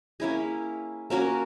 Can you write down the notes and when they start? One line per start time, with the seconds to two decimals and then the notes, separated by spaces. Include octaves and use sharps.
0.20 A#3 C#4 E4 G#4
1.10 A#3 C#4 F#4 A#4